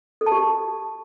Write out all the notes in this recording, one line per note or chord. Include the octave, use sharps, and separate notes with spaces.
A4
A5
G4